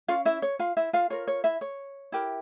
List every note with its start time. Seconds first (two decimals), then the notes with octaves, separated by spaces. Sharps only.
0.08 C#4 F4 F5
0.25 E4 E5
0.42 C#5
0.59 F4 F5
0.77 E4 E5
0.93 F4 F5
1.10 F4 A#4 C#5
1.27 C#5
1.44 E4 E5
1.61 C#5
2.12 E4 G4 A#4